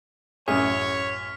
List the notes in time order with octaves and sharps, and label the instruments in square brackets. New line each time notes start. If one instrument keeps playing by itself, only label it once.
[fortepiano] A1 F#2 [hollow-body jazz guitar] G#4 [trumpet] C#5 [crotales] F6 B6